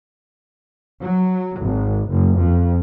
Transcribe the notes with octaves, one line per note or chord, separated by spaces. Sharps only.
F#3
G#1
F#1
F2